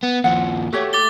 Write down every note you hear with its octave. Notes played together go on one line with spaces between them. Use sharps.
B3
D#2 F3 F#5
A3 F#4 G4 C#5
D6 A6 G7